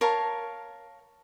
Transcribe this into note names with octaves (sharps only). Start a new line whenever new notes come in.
A#4 C#5 F5 A5